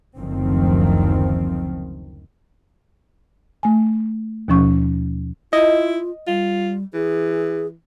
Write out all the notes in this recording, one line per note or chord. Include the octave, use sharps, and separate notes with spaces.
F#1 D2 D#3 F3 C4
A3 G#5
D#2 B2 F3 C#4 C#6
E4 F4 D#5
G3 F4
E3 G#4